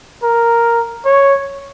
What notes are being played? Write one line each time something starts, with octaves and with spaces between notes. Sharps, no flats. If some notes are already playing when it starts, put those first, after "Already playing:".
A#4
C#5